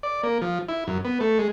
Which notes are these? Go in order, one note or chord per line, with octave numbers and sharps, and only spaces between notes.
D5
A#3
F3
E4
F#2
B3
A3
G#3